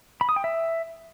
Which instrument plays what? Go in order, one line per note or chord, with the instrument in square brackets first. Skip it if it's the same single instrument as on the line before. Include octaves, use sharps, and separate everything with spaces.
[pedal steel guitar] B5
D#6
G5
E5